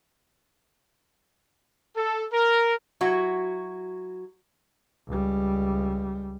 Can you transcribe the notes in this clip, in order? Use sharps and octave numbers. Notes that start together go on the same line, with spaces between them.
A4
A#4
F#3 E4 F#4
C#2 G3